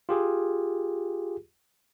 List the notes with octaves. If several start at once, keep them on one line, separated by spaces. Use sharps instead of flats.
F4 G4 G#4